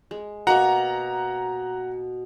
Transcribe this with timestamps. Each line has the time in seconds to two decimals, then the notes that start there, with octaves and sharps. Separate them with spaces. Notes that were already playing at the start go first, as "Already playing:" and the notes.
0.11 G#3
0.47 B2 A#3 F#5 A#5 C#6